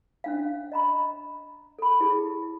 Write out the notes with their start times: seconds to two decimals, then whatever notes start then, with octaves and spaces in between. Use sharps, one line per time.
0.24 C#4 D4 F5
0.72 D#5 A#5 B5
1.79 A4 B5
2.00 E4 G4 G#4